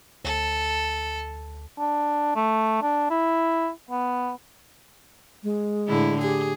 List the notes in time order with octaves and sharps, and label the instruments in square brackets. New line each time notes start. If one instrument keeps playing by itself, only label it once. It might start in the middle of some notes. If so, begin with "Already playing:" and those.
[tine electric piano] D2 [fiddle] A4
[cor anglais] D4
A3
D4
E4
B3
[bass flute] G#3
[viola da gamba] A2 D3 E4
[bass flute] G4 [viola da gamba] G#4